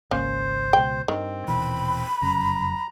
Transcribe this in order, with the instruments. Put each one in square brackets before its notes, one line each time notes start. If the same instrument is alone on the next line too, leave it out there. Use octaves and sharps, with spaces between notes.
[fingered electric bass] G#1 C#2 [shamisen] A#3 C#4 [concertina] C5
[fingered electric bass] C#2 B2 [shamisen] G5
[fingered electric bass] G2 [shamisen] D#3 [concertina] C4
[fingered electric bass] D#1 B2 E3 [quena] B5
[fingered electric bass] F1 F#2 C#3 [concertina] A#5